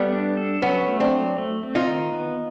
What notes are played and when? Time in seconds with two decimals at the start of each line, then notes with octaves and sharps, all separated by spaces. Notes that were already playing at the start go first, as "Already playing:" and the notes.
Already playing: G3 A3 B3
0.12 D4
0.37 A4
0.62 F#3 B3 C#4
0.87 A3
1.00 C4 D4
1.12 F#3
1.38 A3
1.63 C4
1.75 D#4 F4
1.87 D#3
2.12 B3